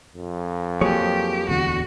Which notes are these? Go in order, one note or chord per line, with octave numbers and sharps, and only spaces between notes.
F2
F#3 A#3 G4 G#4 C#5
D1 E2 D3 F#4